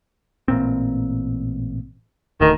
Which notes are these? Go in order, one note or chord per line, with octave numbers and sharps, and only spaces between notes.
A1 A#2 C4
D1 D2 D#3